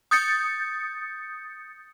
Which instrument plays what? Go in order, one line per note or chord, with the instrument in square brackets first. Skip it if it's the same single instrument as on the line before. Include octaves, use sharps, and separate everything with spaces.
[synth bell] D#6 G6 A6 C#7